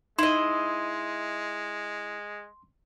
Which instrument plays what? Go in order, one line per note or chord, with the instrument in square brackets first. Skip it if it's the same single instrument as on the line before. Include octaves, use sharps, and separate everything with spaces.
[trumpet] G#3 [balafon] D#4 [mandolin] E4 D#5 [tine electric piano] C6